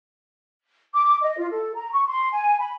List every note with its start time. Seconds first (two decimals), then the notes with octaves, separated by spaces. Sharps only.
0.93 D6
1.21 D#5
1.38 F4
1.51 A4
1.74 A#5
1.92 C#6
2.08 C6
2.32 G#5
2.59 B5